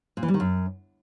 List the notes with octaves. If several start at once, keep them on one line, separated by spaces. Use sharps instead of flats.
A#2
E3
G3
D#3
F#2